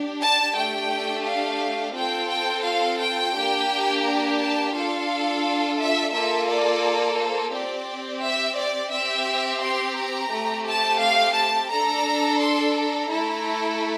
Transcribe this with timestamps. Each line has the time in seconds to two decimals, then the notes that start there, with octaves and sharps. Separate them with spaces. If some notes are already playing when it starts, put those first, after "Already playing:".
Already playing: D4 G4
0.21 A5
0.56 A3 D4 G4 G5
1.25 F5
1.95 C4 F4 A4 G5
2.29 G5
2.64 F5
2.99 G5
3.34 A#3 D4 G4
4.04 A#5
4.39 A5
4.73 D4 F4 A4 F5
5.79 E5
6.13 A#3 F4 A4 E5
6.48 D5
7.18 C5
7.53 C4 G4 D5
8.22 E5
8.58 D5
8.92 C4 G4 E5
9.61 C6
9.96 A#5
10.32 A3 C4 G4
10.67 A5
11.01 F5
11.35 A5
11.71 D4 A4 A#5
12.40 C6
12.75 A#5
13.10 A3 E4 A4